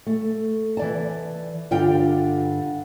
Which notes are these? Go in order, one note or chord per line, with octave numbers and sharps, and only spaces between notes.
A3
E3 D5 A5
G2 D3 F4 G5